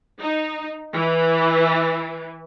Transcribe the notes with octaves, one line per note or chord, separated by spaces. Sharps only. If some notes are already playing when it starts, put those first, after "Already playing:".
D#4
E3